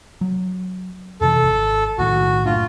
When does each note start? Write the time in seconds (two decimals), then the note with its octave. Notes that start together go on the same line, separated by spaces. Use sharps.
0.21 F#3
1.21 F2 C3 E3 A4
1.43 G#1
1.98 B1 A2 D#3 F#4
2.46 F#1 A2 D4 F4